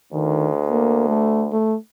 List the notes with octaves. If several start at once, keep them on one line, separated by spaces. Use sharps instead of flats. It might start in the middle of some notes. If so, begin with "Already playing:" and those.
D2 D#3
A#3
A3
A3